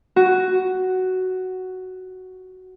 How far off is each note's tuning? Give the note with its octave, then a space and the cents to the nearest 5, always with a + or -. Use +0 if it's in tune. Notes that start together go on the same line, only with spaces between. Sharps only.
F#4 +5